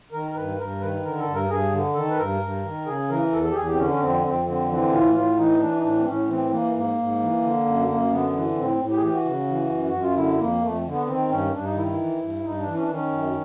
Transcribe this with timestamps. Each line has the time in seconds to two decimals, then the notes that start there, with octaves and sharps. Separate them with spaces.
0.12 D#3 A#4
0.31 A#4
0.35 G2 B4
0.58 G2 A#4
0.81 D#3 B4
1.04 D3 A#4
1.19 A4
1.27 G2
1.34 A#4
1.50 G2 G#4
1.72 D3
1.95 D#3 A4
2.10 B4
2.17 G2 A#4
2.41 G2
2.63 D#3
2.86 C#3 G#4
3.09 E3 A#4
3.32 E2 A4
3.43 A4
3.51 G4
3.54 E2 G#4
3.66 G4
3.73 C4
3.77 D3 C#4
3.89 C#4
4.00 F2 C4
4.22 F2 C4
4.45 D3 C4
4.69 E3 C4
4.91 A2 F4
5.14 A2 F4
5.37 E3 D#4
5.60 E3 D4
5.78 D#4
5.82 A2 D4
5.99 C4
6.06 A2 C#4
6.28 E3 C4
6.50 E3 A#3
6.74 G#2 A#3
6.97 G#2
7.20 E3
7.42 D3
7.66 F#2
7.88 F#2 A#3
8.11 D3 B3
8.34 E3
8.56 A2 C4
8.79 A2
8.90 G4
8.97 G#4
9.01 E3 G4
9.13 F#4
9.25 C#3
9.48 E3
9.70 F#2
9.90 F#2 F#4
10.02 F4
10.16 D3 E4
10.38 F2 A#3
10.61 F2 A3
10.85 D3
10.92 B3
11.07 D#3 C4
11.29 G2 C#4
11.53 G2 D4
11.64 D#4
11.75 D#3 E4
11.87 E4
11.97 E3
12.20 G2
12.43 G2 D#4
12.59 D4
12.66 E3
12.74 C#4
12.82 D4
12.89 D#3 C#4
13.12 F#2